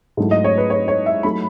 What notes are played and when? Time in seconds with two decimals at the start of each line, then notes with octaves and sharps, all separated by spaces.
0.17 G#2 F#3 A3 E4
0.31 D#5
0.44 C#5
0.58 B4
0.70 C#5
0.88 C#5
1.06 E5
1.23 F#3 A3 D#4 B5